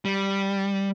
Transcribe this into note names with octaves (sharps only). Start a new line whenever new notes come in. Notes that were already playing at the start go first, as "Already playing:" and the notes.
G3